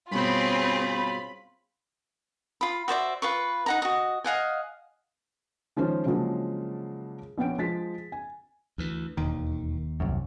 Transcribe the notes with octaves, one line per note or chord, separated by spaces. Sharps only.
G2 B2 C4 C#4 F4 G#4 B5
F4 B5
F#4 C5 D5 E5
F4 B4 C#6
D#4 F#5 A#5
F#4 D#5
D#5 F5 F#5 G#5
D#3 F3 G#3 C#4 F4 C5
C#3 F3 F#3 G#3 A#3 D4
A#1 B3 C#4 G5 D7
F3 G#3 A6 B6
G#5
D2 E3
E1 D#2 D#3
C2 F#2